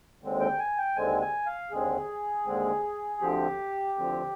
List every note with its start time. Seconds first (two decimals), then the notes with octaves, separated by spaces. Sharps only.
0.21 D#2 D3 G#3 C4
0.40 G5
0.59 G#5
0.78 G5
0.96 D#2 D3 G#3 C4 G#5
1.21 G#5
1.46 F5
1.71 D#2 D3 G#3 C4 G#4
2.46 D#2 D3 G#3 C4
3.21 D2 D3 F3 C4 G4
3.96 D2 D3 F3 C4